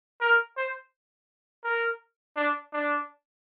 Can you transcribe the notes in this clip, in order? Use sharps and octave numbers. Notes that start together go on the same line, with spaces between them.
A#4
C5
A#4
D4
D4